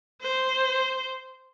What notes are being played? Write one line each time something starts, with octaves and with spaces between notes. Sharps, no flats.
C5